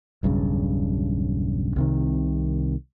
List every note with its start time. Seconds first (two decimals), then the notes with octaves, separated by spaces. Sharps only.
0.23 E1 B1 G2 C#3
1.76 C2 C3 D#3